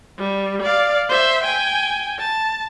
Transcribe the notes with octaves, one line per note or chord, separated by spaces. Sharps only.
G3
D5 F5
C5 E5
G5 G#5
A5